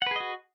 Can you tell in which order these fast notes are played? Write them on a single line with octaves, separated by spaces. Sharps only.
F#5 B4 G#4 D#5 F#4